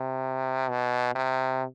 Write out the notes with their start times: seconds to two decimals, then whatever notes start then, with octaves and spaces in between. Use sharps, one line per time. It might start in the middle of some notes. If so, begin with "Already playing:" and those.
Already playing: C3
0.69 B2
1.15 C3